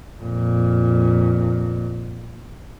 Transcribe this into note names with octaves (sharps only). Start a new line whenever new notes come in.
F2 A#2